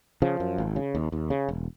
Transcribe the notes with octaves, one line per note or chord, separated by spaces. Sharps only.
C#3 F3
F#2
G#1
C#3
D#2
D#2
C#3
E1